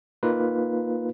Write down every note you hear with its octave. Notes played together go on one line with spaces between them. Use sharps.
A#3 D#4 F4 B4